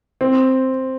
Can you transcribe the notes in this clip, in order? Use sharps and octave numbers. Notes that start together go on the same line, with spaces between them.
C4